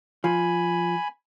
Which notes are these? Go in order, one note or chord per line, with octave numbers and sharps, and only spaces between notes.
F3 G#5 B5